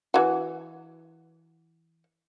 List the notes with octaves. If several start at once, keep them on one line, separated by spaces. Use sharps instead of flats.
E3 F#4